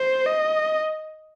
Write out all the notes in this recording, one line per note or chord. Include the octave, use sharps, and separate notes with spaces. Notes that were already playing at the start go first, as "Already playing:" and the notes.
Already playing: C5
D#5